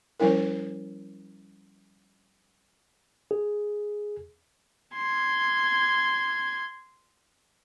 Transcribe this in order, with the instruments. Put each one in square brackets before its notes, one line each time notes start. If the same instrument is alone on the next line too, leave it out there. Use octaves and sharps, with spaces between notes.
[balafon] F3 G3 C#4 E4 A#4
[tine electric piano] G#4
[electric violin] C6 G#6